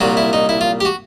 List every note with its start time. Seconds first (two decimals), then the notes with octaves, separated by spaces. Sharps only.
0.01 C2 A#2 F#3 F#4
0.17 E4
0.33 D#4
0.49 E4
0.61 F4
0.80 G4
0.85 F#4